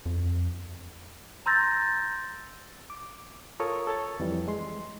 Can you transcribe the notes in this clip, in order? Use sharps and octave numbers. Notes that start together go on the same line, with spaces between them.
F2
A#5 C6 E6 G6 A6 A#6
D6
F4 A4 A#4 C#5 C#6 D#6
A4 C#5 A6
F2 E3 G3
G#3 C6